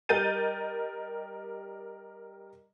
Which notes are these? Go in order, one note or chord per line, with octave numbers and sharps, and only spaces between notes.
G3 A#4 D#5 G6 A6 D#7